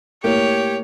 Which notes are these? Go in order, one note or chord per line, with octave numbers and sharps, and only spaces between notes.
A2 A#3 G4 C#5